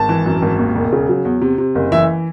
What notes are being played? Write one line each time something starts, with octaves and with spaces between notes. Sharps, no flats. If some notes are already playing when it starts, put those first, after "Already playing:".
Already playing: G#1 A5
E3
F#2
G#1
D#2
E1
C#3
F#3
E2
C3
C3
F#1
E3 E5